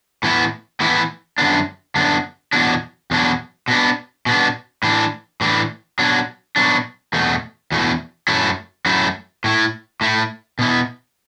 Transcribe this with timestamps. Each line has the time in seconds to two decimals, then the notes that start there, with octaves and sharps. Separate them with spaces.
0.23 A2 E3 B3 E4
0.80 A2 E3 B3 E4
1.38 F#2 D3 B3 D4
1.96 F#2 D3 B3 D4
2.53 E2 B2 F#3 D4
3.11 E2 B2 F#3 D4
3.68 B2 B3 D4
4.26 B2 B3 D4
4.83 A2 E3 D4
5.41 A2 E3 D4
5.99 B2 F#3 D4
6.56 B2 F#3 D4
7.13 E2 B2 A3
7.72 E2 B2 A3
8.28 F#2 F#3 A3 E4
8.86 F#2 F#3 A3 E4
9.44 A2 A3 E4
10.01 A2 A3 E4
10.59 B2 B3 E4